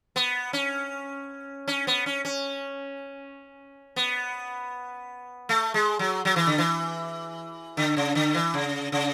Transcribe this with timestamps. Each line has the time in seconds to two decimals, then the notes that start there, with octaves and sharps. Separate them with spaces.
0.16 B3
0.53 C#4
1.68 C#4
1.87 B3
2.06 C#4
2.25 C#4
3.96 B3
5.49 A3
5.74 G#3
5.99 F#3
6.25 F#3
6.36 E3
6.47 D3
6.58 E3
7.77 D3
7.97 C#3
8.15 D3
8.35 E3
8.54 C#3
8.92 C#3